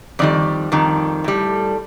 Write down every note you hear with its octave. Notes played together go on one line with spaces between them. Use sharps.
F2 D#3 G3 D5
F2 D#3 G3
A2 G3